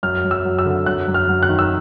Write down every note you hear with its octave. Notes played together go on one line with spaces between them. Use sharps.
F#2 F6
F#2
E6
F#3
E6
D3
F#2 F#6
F#2
F6
F#3
F#6
D#3
E6